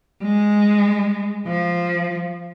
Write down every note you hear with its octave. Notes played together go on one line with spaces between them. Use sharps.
G#3
F3